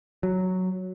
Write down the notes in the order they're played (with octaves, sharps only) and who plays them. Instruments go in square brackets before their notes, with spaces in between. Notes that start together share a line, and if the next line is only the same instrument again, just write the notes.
[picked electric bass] F#3